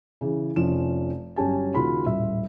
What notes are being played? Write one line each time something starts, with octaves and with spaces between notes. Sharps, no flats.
C#3 E3
F1 F3 C#4 E7
G1 F#3 C#4 G4 G#5 A5
D#2 C#3 F4 F#4 B5 C6
D#1 A1 E5